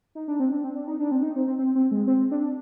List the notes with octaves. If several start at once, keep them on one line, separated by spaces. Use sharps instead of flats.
D#4
D4
C4
D4
C4
D4
D#4
D4
C4
D#4
C4
C4
C4
C4
G#3
C4
D4